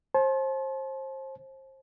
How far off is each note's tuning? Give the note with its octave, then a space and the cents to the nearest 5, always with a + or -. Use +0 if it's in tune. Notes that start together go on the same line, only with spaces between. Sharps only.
C5 +30 A5 -40